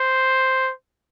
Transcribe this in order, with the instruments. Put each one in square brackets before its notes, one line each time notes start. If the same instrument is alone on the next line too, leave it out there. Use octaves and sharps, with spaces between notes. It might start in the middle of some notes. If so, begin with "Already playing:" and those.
Already playing: [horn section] C5